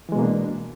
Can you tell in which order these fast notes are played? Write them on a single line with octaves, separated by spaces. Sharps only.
E3 G#3 B2 A#3 D4